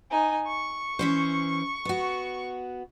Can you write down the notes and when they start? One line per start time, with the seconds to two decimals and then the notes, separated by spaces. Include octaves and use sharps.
0.11 D#4 G#5
0.47 C#6
0.99 E3 C#4 C5
1.85 B3 F#4